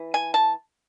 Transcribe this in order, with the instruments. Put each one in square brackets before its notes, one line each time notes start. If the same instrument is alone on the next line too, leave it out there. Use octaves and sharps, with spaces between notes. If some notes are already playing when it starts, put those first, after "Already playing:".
Already playing: [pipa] E3
G#5
A5